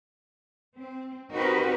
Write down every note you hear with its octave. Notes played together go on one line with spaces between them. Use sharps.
C4
C4 D#4 F#4 G4 A#4 B4